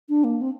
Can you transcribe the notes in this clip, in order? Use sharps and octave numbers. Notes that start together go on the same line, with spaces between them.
D4
A#3
C4